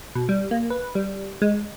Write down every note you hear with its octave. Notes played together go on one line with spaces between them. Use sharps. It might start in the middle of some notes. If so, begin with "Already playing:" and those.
B2
G3
A#3
B4
G3
G#3